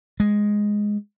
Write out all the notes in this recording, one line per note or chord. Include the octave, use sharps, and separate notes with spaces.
G#3